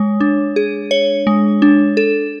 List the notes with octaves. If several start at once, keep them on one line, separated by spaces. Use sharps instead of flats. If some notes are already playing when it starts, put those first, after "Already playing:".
Already playing: G#3 C#5
D4
G#4
C#5
G#3
D4
A4